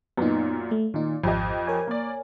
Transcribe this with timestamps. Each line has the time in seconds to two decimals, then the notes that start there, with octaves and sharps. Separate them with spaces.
0.17 F#2 A#2 B3 D#4
0.71 A3
0.94 A#2 D#3 D#4
1.24 G#1 F2 G4 D#5
1.67 A#4 C#5 G#5
1.87 A#3 D5